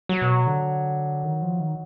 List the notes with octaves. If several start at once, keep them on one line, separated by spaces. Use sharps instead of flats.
F#3
B2
D3
D#3
F3
D#3